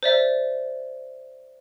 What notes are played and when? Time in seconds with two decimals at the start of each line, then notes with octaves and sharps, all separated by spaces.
0.03 C5 D5 E5